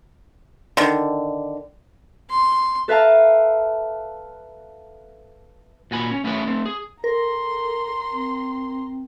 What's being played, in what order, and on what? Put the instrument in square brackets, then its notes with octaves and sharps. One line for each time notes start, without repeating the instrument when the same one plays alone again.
[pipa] D3 D#3
[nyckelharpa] C6
[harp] A4 B4 E5 F5 A5 A#5
[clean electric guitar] A#2 F#4 G#5 B5
C#4
A3 B3 C#4 E4 B4
A3 C4
G#4
[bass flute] A4 [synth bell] A#4 [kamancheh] A#5 C6
[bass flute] C4